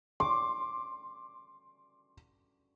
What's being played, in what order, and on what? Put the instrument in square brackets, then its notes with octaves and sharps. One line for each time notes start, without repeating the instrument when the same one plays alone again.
[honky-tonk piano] C6 [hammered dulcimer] D6